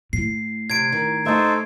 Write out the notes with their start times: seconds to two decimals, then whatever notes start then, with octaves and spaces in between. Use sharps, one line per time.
0.13 A2 C7
0.70 C3 G#6 D7
0.92 D#3
1.26 A3 D#4 A4 C5 E5